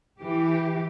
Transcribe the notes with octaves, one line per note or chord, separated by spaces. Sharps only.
E3 G4